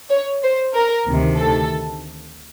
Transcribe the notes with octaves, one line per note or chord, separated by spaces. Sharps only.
C#5
C5
A#4
D2 C3 D#3
A4